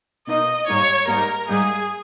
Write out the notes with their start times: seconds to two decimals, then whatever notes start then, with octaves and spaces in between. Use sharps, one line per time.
0.27 B2 A#3 D#4 D#5
0.67 G#2 G3 A#3 D#4 C#5
1.07 G#2 G3 A#3 D#4 A#4
1.48 G#2 G3 A#3 D#4 G#4